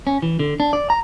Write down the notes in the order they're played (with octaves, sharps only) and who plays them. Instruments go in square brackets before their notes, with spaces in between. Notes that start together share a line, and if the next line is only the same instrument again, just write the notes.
[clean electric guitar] C#4
E3
D3
D4
D5
A#5